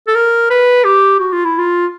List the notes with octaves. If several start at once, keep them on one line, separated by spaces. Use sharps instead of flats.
A4
A#4
B4
G4
F#4
F4
E4
F4